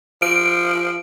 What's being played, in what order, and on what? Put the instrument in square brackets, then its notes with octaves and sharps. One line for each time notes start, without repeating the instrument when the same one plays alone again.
[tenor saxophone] F3 [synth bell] D7